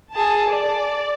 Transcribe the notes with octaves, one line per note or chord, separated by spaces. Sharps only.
G#4 A5
D5